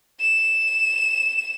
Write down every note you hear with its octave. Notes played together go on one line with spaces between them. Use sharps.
E7